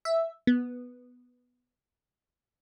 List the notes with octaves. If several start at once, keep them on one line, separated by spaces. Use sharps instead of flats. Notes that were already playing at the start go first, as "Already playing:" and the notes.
E5
B3